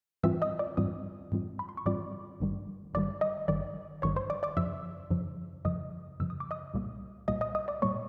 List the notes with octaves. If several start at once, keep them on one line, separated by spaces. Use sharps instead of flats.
G#2 E3 G3 C4 F4 E5 E6
D#5 D#6
D5 D6
G#2 E3 G3 C4 F4 D#5 D#6
G#2 E3 G3 C4 F4
B5
C6
C#6
G#2 E3 G3 C4 F4 D5 D6
G#1 G2 D#3 G3
G#1 G2 D#3 G3 D5 D6
D#5 D#6
G#1 G2 D#3 G3 D5 D6
G#1 G2 D#3 G3 C#5 C#6
C5 C6
D5 D6
D5 D6
F#2 C#3 F3 E5 E6
F#2 C#3 F3
F#2 C#3 F3 D#5 D#6
F#2 C#3 F3 E6
D#6
D6
D#5 D#6
C2 A#2 G3 A#3
C2 A#2 G3 A#3 D#5 D#6
D#5 D#6
D#5 D#6
D5 D6
A#2 G3 A#3 C#5 C#6